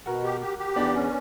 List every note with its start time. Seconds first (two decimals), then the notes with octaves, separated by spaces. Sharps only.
0.06 B2 F#4 A#4
0.24 G4
0.41 G4
0.58 G4
0.76 E2 B3 D4
0.94 C#4